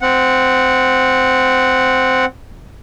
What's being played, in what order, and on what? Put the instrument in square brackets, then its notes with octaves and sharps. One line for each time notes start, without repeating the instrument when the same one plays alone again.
[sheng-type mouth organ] C4 F#5